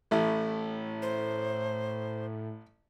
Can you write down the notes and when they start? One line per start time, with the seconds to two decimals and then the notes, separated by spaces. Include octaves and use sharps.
0.11 A1 A2 A3 E4
1.02 C5